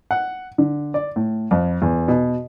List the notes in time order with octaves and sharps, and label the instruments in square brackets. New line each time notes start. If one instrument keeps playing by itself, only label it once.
[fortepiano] F#5
D3
D5
A2
F2
E2
B2